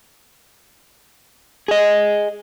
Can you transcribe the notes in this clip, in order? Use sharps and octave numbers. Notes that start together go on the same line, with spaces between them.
G#4 D#5